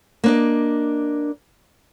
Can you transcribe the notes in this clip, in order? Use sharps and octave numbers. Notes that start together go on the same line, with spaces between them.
A#3 D4 D#5